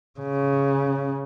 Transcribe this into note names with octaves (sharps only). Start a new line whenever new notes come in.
C#3